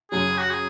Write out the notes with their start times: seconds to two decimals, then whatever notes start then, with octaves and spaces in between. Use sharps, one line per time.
0.11 F#2 C#3 F#3 G#4
0.38 F#4
0.50 G#4